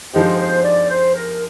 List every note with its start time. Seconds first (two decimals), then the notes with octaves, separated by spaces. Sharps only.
0.13 D3 F3 G#3 D#4 G4 C5
0.38 C5
0.63 D5
0.88 C5
1.14 A#4